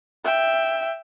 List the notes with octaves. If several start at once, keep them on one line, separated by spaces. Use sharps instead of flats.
E5 G5